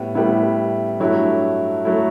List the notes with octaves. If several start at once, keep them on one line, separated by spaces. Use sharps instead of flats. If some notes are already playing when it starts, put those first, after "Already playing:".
Already playing: A2 G3 B3 E4
A2 G3 B3 E4
G2 F#3 A3 E4
F#3 A3 E4